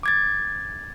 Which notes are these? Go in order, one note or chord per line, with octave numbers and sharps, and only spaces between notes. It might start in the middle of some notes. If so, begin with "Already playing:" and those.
D6 G#6 A6